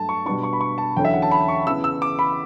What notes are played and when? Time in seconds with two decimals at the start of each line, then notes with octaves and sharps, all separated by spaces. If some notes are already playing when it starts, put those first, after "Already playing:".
Already playing: G2 F#3 A3 A5
0.09 C#6
0.26 B2 G3 B3 D4 C#6
0.43 C#6
0.53 B5
0.61 C#6
0.78 A5
0.97 E2 D3 F#3 C#4 G5
1.05 E5
1.13 F#5
1.22 A5
1.31 B5
1.48 C#6
1.66 C#3 E3 B3 E4 E6
1.84 E6
2.02 D6
2.19 B5